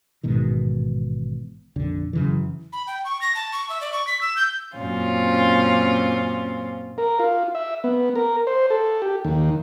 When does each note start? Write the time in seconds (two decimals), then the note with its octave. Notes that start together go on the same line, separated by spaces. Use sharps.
0.23 A1 G#2 B2 D#3
1.76 A#1 F2 D3
2.13 F#2 C#3 E3
2.73 B5
2.87 G5
3.05 C#6
3.21 A#6
3.35 A5
3.52 C#6
3.70 E5
3.81 D5
3.93 C#6
4.07 B6
4.21 E6
4.36 G6
4.76 F#2 A#2 C4 C#4 F4
6.98 A#4
7.19 F4
7.55 E5
7.84 B3
8.16 A#4
8.47 C5
8.70 A4
9.02 G4
9.25 D#2